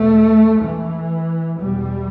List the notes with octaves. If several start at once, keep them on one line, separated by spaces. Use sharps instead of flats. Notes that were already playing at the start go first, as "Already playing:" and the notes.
Already playing: E2 B2 A3
E3
E2 B2 G3